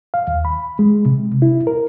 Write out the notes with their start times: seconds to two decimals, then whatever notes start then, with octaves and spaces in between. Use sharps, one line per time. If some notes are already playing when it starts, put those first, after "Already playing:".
0.14 F5
0.28 D#2
0.45 B5
0.79 G#3
1.06 C3
1.42 E4
1.67 A#4